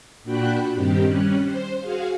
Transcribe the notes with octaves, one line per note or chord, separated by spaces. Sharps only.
A#2 D4 F#4 G5 B5 F#6
G2 D#3 C4 G4
G3 C#4 F#6
C5
F#4 G#4 F5